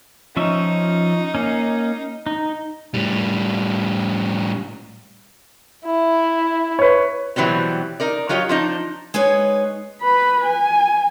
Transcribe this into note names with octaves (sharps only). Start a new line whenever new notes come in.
F3 C#4 D#4 E5
A#3 C#4
D#4
A2 G3
E4
B4 C#5
B2 E3 F#3 G3 C4
D#4 A#4 D5
F#3 F4 G4 C#5 D#5
F3 D4 D#4
G#3 D#4 B4 C#5
B4 B5
G#5